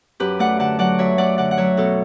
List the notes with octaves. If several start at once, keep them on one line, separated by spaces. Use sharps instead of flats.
F#2 G4 B4
A3 D5 F#5
D3 F#5 A5
F#3 D5 F#5
F#2 C#5 E5
A3 D5 F#5
D3 D5 F#5
F#5
F#3 C#5 E5
B2 F#4 A4